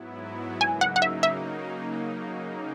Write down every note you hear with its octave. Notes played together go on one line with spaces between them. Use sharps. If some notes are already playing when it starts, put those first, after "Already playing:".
Already playing: G#2 F#3 B3 E4
C#3 F#3 A#3 D#4 G#5
F#5
F#5
E5
E5